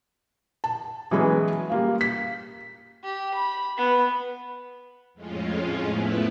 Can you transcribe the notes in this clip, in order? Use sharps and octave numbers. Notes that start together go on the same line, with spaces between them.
A5
E3 F#3 G#3 B3 C#4
G3 A#3 F4
B6
G4
B5
B3
F2 A2 G#3 C#4 F4
F3 A3 B3 E4 B4